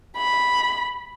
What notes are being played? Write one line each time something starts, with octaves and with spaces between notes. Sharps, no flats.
B5